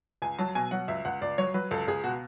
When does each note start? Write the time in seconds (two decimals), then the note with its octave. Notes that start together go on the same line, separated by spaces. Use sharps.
0.22 C#2 G#5
0.39 F#3 A5
0.55 B2 G#5
0.71 F#3 F#5
0.88 C#2 E5
1.05 C#2 F#5
1.22 C#2 D5
1.38 F#3 C#5
1.54 F#3 B4
1.71 C#2 A4
1.87 C#2 G#4
2.04 B2 F#4